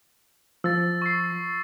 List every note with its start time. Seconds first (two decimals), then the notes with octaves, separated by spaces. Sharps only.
0.64 F3 E6 A6
1.02 C#6 C7